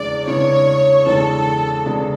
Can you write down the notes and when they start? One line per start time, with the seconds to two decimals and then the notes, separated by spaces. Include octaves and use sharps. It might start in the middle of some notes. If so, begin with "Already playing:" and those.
Already playing: E2 C#3 E3 G#3 D4 D5
0.27 E2 C#3 E3 G#3 D4 C#5
1.06 E2 C#3 E3 G#3 D4 A4
1.86 E2 C#3 E3 G#3 D4